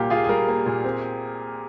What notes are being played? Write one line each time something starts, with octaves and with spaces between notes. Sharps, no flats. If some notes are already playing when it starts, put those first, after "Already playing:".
Already playing: A#2 G3 A#3 G4
F4 G#4
G#4
G3 A#4
A#3
A#2
C4